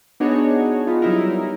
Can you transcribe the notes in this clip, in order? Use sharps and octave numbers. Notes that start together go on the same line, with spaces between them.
B3 D4 D#4 F#4 G#4 C#5
G#3 B3 D#4 F4
F#3 G3 D#4 E4 A#4